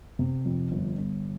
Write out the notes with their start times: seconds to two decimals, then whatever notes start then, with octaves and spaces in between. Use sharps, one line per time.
0.19 C3
0.45 F2
0.72 G1
0.98 G1